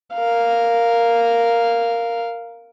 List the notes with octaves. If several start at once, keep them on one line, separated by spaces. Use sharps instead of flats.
A#4 F5